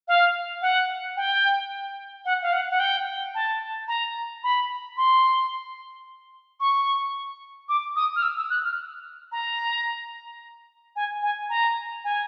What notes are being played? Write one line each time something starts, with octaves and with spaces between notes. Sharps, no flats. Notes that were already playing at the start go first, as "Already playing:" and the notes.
F5
F#5
G5
F#5
F5
F#5
F#5
G5
A5
A#5
B5
C6
C#6
D6
D#6
F6
E6
E6
F#6
F6
A#5
G#5
G#5
A#5
G#5